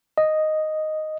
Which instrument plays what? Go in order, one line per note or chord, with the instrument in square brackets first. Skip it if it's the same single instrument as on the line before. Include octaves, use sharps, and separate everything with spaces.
[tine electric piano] D#5